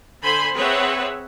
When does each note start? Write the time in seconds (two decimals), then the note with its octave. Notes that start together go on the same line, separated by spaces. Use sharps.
0.23 D3 C5 G#5 B5 C6
0.55 C4 G#4 B4 C#5 E5 F#5